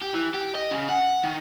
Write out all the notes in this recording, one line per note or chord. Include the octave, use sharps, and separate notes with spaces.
G4
E3
G4
D#5
C#3
F#5
D#3